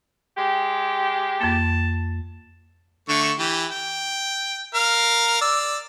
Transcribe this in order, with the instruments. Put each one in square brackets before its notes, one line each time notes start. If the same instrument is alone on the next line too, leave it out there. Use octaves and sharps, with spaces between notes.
[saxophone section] G#3 G4
[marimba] F2 A#3 [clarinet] A5
[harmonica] D3 A3 C#6
E3 G4
G5
A#4 F5
D5 E6